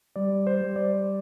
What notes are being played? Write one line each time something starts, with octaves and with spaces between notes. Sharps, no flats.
G3 D5
C5
G3
D5